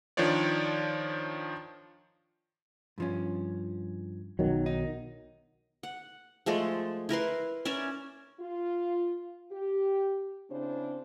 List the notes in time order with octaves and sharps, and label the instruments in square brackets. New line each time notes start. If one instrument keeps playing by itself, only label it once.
[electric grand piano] D#3 F3 D4 F4 C#5 D5
[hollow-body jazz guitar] G2 F3 C#4
[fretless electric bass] B1 D#3 F#3
[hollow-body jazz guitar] D#4
[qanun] F#5
F3 G#3 A3 A4
E4 A#4 B4 C6
C#4 A#4 D5 E5
[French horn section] F4
G4
C#3 C4 D4 E4 C5